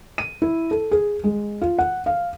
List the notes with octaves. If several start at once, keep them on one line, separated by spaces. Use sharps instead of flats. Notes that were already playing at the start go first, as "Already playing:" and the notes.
D#7
E4
A4
G#4
G#3
F4
F#5
F5